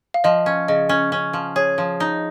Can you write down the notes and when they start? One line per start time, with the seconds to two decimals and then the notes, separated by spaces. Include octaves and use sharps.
0.14 F5
0.24 F3 D#5
0.46 C#4
0.68 C#3 D#5
0.89 C#4
1.12 C#4
1.33 F3
1.56 G#4 C#5
1.78 F3
2.00 D#4